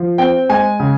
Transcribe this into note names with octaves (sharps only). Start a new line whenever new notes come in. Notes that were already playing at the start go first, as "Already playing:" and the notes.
Already playing: F3
C4 G5
G#3 G#5
C#3